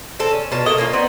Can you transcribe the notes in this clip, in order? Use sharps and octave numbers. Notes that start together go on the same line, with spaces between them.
C4 A4
C#4
B2 F4 C#5 A5
A3 A#3 D#5
A#3 C#4 F4
B3 C4 D#4